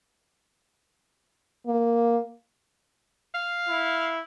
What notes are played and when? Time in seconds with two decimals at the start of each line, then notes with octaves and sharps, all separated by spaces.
1.67 A#3
3.35 F5
3.68 E4